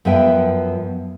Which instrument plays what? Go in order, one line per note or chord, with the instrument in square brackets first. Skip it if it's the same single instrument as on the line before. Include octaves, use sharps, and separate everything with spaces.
[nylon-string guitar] F#2 F3 B3 B4 E5 G5